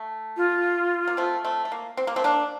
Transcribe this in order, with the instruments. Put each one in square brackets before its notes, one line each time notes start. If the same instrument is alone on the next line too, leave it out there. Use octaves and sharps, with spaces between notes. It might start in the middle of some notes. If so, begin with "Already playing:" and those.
Already playing: [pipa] A3
[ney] F4
[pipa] A#3
A3 C4
A3 C4
A3
A#3
C4
A#3
A3 C4
A#3 D4